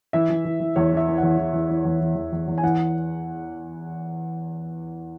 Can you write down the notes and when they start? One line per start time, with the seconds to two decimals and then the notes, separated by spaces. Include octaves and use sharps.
0.13 E3 E5
0.30 E3
0.45 E3
0.60 E3
0.76 E2 C#5
0.92 E3 E5
1.08 E3
1.18 F#5
1.23 E2
1.38 E3
1.53 E3
1.69 E3
1.85 E2
2.00 E3
2.16 E2
2.32 E2
2.48 E2
2.58 G#5
2.63 E3 F#5